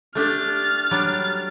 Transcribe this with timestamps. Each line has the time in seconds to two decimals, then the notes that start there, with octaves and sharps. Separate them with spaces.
0.15 A3 D4 G4 F6 A6
0.91 F#3 G3 D4